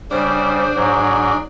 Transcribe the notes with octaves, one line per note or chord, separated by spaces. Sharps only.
C#3 G3 D4 C5
G#2 F#3